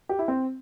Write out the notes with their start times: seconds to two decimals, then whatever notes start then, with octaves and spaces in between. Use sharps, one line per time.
0.09 G4
0.19 E4
0.28 C4